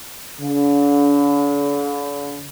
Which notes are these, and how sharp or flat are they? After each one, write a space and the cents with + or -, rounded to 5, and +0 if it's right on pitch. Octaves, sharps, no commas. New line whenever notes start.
D3 -45